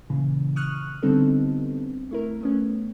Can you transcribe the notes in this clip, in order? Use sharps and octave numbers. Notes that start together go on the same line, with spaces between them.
A#2 C#3 E3
C#6 D#6 F6 F#6
D3 G3 B3 C4 D#4 A4
A3 E4 A#4
A3 B3 C#4